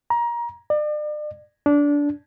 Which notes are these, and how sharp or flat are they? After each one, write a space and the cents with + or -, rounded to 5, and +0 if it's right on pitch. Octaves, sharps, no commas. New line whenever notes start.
A#5 +25
D5 +40
D4 -20